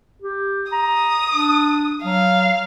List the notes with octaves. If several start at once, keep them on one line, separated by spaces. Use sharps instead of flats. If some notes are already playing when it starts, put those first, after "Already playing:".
G4
A#5 D#6
D4
F#3 F5